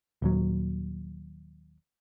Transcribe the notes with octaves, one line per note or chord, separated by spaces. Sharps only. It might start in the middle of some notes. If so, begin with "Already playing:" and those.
D#1 D#2 F#3